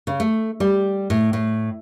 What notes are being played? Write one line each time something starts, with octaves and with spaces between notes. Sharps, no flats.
C#3
A3
G3
A2
A2